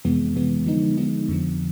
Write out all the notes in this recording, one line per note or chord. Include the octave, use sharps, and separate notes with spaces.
F2 C3 E3 G#3 B3
F2 C3 E3 G#3 B3
D3 F3 G#3 B3 D#4
D3 F3 G#3 B3 D#4
F2 D3 F3